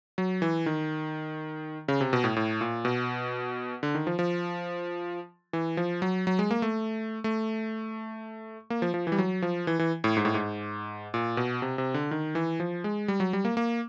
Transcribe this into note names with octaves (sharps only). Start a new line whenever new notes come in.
F#3
E3
D#3
C#3
C3
B2
A2
A2
A#2
B2
D3
D#3
F3
F3
E3
F3
F#3
F#3
G#3
A#3
A3
A3
A#3
F3
F3
E3
G3
F#3
F3
E3
E3
A2
G#2
A2
G#2
A#2
B2
C3
C3
D3
D#3
E3
F3
G#3
G3
F#3
G3
A#3
A#3